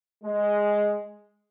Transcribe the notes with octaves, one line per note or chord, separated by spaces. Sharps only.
G#3